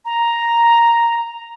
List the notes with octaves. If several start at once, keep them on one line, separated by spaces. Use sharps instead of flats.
A#5